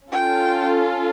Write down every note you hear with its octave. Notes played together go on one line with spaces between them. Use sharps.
C#4 F4 A4 G5